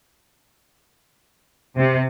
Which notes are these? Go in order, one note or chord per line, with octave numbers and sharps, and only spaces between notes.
C3